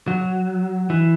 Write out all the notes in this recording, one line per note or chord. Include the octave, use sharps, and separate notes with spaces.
F#3
E3